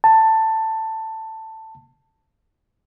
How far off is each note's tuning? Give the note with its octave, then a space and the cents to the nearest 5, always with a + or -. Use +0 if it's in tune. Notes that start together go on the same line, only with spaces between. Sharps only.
A5 +10